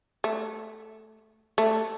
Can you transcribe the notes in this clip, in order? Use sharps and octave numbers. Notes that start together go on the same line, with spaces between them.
A3
A3